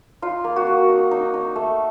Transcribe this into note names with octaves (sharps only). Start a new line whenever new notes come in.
D#4 F4
A#3
F#4
A#3
D#4
D#4
D#4
A3